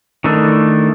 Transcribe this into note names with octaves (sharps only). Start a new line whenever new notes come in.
D#3 E3 A3 D4